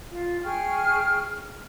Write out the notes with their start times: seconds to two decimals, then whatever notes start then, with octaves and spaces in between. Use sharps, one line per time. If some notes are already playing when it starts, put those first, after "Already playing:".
0.12 F4
0.44 G#4 G5 C#6 F6